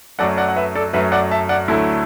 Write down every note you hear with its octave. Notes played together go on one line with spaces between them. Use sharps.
F#2 F#3 A3 D5 F#5
D5 F#5
F#5
B4 E5
A4 D5
F#2 F#3 A3 B4 E5
D5 F#5
E5 A5
D5 F#5
D2 D3 F#3 A3 E4